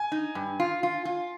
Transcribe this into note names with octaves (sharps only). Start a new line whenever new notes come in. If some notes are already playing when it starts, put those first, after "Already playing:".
Already playing: G#5
D#4
G2
F4
F4
F4